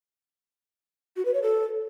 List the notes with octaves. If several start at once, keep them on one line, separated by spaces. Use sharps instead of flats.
F#4
B4
C#5
A4